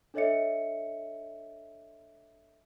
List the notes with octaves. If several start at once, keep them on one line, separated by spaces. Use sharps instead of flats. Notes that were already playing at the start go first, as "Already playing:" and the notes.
D4 A4 C#5 D#5 E5 C#7